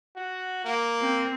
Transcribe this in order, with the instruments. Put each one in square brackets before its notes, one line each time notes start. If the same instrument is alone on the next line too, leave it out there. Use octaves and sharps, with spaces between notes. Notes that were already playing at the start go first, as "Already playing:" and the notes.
[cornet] F#4
A#3
[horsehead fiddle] C4